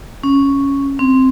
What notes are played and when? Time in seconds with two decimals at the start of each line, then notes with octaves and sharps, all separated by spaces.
0.24 C#4
0.99 C4